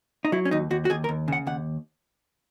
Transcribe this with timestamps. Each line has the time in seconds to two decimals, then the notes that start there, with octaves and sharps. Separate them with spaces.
0.25 D#4
0.32 F#3 E4
0.45 C#4
0.51 D#2 D#4
0.71 D#2 F#4
0.85 F#4
0.90 D#2 G#4
1.04 A#4
1.09 D#2
1.28 C#3 F#5
1.47 D#2 F#5